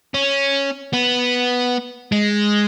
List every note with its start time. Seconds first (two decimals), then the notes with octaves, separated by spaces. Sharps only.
0.14 C#4
0.93 B3
2.12 G#3